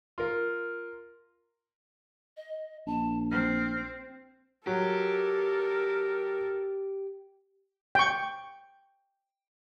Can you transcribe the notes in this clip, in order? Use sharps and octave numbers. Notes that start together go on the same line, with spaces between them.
F4 A#4
D#5
A#1 A5
C4 F6
F#3 G4 A4 A#4
G5 C#6